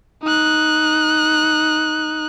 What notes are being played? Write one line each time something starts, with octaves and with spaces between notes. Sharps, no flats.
D#4 F#6